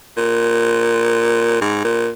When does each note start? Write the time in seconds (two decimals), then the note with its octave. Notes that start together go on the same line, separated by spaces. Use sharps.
0.17 A#2
1.61 G#2
1.84 A#2